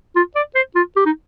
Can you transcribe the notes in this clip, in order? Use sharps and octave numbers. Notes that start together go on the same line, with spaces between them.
F4
D5
C5
F4
G4
D#4